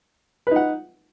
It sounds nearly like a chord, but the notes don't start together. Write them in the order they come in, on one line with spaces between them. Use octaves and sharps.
B4 D#4 F#5